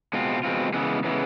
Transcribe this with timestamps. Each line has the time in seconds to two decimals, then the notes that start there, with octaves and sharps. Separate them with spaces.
0.13 B2 G#3 C4 F4
0.43 B2 G#3 C4 F4
0.74 C#3 E3 G#3 B3
1.04 C#3 E3 G#3 B3